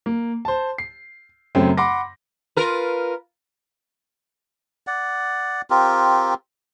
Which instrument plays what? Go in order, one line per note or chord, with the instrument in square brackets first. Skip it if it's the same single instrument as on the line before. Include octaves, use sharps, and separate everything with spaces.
[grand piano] A#3
C5 A5
C7
F#2 C#3 F#3 A3 C4
F#5 B5 C6 D6 A#6
[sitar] F4 A#4 B4
[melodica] D5 F#5
C4 F4 G4 A#4